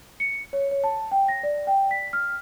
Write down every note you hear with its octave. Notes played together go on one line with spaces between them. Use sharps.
C#7
C#5
C#5
A5
G5
A#6
D5
G5
B6
F6